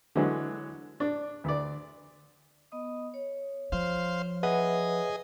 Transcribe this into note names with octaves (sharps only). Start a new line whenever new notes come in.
D3 E3 F#3 G#3
D4
D2 D5
B3 D#5 D#6
C#5
F3 C5 F5
G#4 B4 D#5 E5 F#5